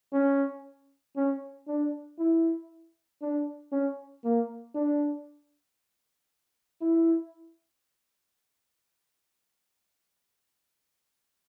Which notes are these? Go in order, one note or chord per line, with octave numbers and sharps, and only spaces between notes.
C#4
C#4
D4
E4
D4
C#4
A#3
D4
E4